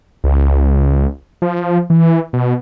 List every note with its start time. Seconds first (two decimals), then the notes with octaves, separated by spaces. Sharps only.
0.24 C#2
1.42 F3
1.90 E3
2.33 B2